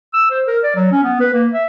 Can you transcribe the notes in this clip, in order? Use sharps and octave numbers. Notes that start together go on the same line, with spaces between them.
E6
C5
A#4
D5
F#3
C#4
B3
B4
A#3
E5